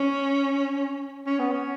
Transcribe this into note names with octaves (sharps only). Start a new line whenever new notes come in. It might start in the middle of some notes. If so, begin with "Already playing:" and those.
Already playing: C#4
C#4
B3
C#4